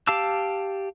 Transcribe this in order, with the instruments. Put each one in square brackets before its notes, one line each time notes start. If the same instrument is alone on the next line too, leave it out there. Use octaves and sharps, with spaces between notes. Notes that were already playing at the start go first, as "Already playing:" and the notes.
[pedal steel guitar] G4 F5 A5 D6 E6